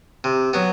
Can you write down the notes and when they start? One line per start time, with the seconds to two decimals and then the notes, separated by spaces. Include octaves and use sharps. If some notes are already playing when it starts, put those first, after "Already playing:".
0.24 C3
0.53 F#3 B3